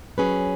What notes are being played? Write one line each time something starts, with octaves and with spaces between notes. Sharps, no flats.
F#3 C#4 G#4 B4